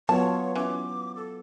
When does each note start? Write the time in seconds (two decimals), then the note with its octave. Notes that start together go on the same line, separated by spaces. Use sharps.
0.09 F#3 B3 F4 C#5 A5
0.56 E3 C#4 D6
1.16 A4